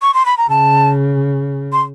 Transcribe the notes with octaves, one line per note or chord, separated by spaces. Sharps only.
C#6
C6
B5
A#5
C#3 A5
C6